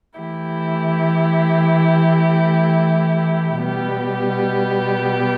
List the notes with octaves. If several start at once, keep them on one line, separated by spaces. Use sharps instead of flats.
E3 A3 E4 G4
B2 G3 B3 G4